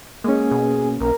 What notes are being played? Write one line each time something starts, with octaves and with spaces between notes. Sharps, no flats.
G#3 A#3 C#4 G#4
B2
B1 A#4